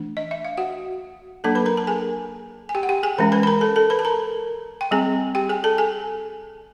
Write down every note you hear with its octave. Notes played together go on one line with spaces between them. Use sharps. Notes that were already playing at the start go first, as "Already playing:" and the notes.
Already playing: E3 A3 D4
D#5
E5
F5
F#4 F#5
F#3 A#3 D4 A4 A5
B4 B5
A#4 A#5
A5
G#4 G#5
G#5
G4 G5
F#5
G4 G5
G#4 G#5
E3 G#3 C#4 A#4 A#5
B4 B5
B5
A#4 A#5
A4 A5
A4 A5
B4 B5
A5
A#4 A#5
G5
G3 C4 G#4 G#5
G4 G5
G#4 G#5
A4 A5
G#4 G#5